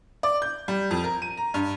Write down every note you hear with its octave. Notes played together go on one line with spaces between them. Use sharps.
D5
G6
G3
F2
A#4
D#7
A#5
G2